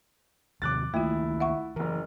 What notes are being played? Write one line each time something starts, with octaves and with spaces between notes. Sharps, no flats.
D#2 C3 F3 D6 F#6 A6
C#2 D#3 A3 A#3 E4 F4
E5 F#5 C#6
F#1 E3 A#4